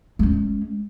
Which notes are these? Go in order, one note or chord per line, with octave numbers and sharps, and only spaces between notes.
G#3 C#4